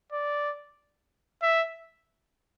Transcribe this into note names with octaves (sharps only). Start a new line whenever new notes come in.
D5
E5